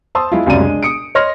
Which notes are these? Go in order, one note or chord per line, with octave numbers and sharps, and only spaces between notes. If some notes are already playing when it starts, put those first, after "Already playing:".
C5 A5 C6 D#6 E6
G#3 E4 F4
C#2 F#2 C3 D5 D#7
G#3 D4
D#6 C#7 D7
C#5 D#5 C6 F6 A#6